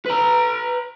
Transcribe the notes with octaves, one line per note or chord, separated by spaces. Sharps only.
B4 A#5